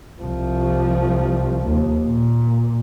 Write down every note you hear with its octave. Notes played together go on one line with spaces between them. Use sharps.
C2 F3
D#2
A#2